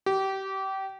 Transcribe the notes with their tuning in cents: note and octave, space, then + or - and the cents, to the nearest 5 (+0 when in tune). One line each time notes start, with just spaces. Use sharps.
G4 -25